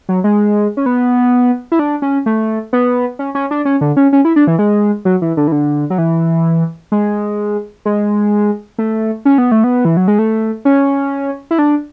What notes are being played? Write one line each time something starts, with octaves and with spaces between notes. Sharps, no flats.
F#3
G#3
C#4
B3
E4
D4
C#4
A3
B3
C#4
C#4
D4
C#4
D3
C#4
C#4
E4
D4
E3
G#3
F#3
E3
D3
E3
D3
F#3
E3
G#3
G#3
A3
C#4
B3
A3
B3
E3
F#3
G#3
A3
C#4
E4
D4